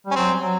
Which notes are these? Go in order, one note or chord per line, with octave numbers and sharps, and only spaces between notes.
G3 C#4
F#3 C4
F#3